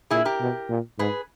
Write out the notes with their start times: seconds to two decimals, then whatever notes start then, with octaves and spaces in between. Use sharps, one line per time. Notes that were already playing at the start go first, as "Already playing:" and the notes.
0.11 A#2 E4 G#4
0.25 G4 A#4
0.41 B2
0.70 A#2
0.99 G#2 G#4 B4